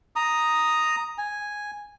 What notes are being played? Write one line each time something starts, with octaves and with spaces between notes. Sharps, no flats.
A#5 D#6
G#5